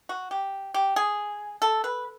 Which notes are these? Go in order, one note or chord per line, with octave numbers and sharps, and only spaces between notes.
F#4
G4
G4
G#4
A4
B4